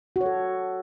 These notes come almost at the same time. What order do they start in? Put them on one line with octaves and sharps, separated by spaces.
F#4 C#5 A4